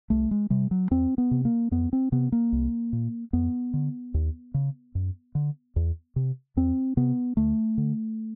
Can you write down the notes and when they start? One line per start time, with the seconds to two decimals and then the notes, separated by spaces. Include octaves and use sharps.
0.10 C2 A3
0.31 G#3
0.50 C3 G3
0.71 F#3
0.91 E2 C4
1.18 B3
1.31 C3
1.45 A#3
1.71 F2 B3
1.93 C4
2.12 C3 B3
2.32 A#3
2.52 C2
2.93 A#2
3.33 F2 B3
3.74 D3
4.14 D#2
4.54 C#3
4.95 F#2
5.35 D3
5.76 E2
6.16 C3
6.57 E2 C4
6.97 C3 B3
7.37 D2 A3
7.78 D3